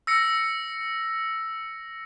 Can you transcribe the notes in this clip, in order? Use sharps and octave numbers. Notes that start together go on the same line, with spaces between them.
E6 A#6 C#7